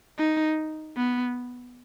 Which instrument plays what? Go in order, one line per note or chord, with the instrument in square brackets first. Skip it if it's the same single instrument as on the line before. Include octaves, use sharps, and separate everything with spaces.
[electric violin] D#4
B3